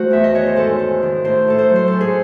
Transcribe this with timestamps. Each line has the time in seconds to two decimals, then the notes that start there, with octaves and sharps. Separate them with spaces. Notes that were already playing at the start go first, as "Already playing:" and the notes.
Already playing: A3 F#4 C5
0.11 E2 E5
0.24 D#5
0.34 D#3 C#5
0.46 C5
0.56 G#2 A4
0.79 G#2
1.03 D#3
1.25 A2 C5
1.47 A2 A4
1.58 C5
1.70 F#3
1.76 C5
1.88 G#2 A4
2.01 G#4